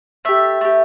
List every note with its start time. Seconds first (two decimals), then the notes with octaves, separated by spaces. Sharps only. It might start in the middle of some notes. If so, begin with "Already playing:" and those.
0.25 A3 G4 E5
0.61 A3 G4